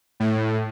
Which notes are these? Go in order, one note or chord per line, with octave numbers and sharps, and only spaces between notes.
A2